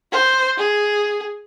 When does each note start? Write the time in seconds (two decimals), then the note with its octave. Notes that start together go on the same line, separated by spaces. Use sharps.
0.11 C5
0.58 G#4